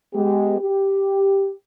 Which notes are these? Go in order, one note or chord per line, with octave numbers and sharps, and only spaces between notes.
G#3 B3 G4
G4